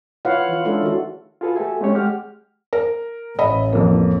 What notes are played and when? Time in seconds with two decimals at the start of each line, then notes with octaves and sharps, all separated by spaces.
0.25 E4 F4 B4 C#5 F5 F#5
0.49 E3 F4
0.65 G#3 A3 C#4 D4 F4 A4
0.82 D#3 F#4
1.41 F4 F#4 G#4 A4 B4
1.56 A3 F#4 G4 A4 E5 G#5
1.81 G#3 A3 C4 C#4 G4 C#5
1.95 G#3 G4 F#5 F6
2.73 A#4
3.39 A1 D#5 E5 B5
3.73 F2 A#3